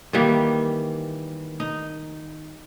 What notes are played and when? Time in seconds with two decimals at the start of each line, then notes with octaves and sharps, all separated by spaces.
0.13 D#3 E3 G3 A#3
1.60 D#4